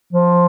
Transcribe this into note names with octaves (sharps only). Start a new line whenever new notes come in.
F3